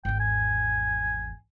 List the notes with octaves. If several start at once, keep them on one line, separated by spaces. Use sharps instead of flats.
G#1 E2 G5
G#5